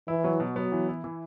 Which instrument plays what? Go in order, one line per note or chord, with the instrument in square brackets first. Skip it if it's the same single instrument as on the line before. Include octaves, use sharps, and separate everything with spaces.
[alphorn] E3 [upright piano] E4
[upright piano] F#3
B2
[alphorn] F#3 [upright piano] B3
[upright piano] E3
E4
E3